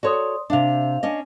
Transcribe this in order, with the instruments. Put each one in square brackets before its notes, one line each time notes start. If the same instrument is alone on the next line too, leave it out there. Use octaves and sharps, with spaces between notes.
[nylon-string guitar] F#4 A4 C#5 [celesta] D5 C6 D#6
[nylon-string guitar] C3 D4 [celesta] E5 F5 F7
[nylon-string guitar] C#4 D4 D#5